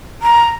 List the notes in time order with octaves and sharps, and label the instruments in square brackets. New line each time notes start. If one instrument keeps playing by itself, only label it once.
[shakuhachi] A#5